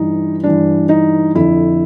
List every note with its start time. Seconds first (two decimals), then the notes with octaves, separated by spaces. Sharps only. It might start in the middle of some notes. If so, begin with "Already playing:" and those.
Already playing: G2 E3 D#4
0.44 G2 E3 D4
0.89 D#4
1.35 F2 D3 E4